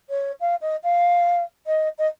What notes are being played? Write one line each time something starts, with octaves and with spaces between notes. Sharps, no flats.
C#5
F5
D#5
F5
D#5
D#5